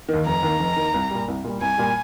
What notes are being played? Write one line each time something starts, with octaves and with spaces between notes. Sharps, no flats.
D#3
D#2
F1 A#5
D#2 D#3
F1
D#2 D#3
C2
A#2 G3
C2
A#2 G3
C2 G#5
A#2 G3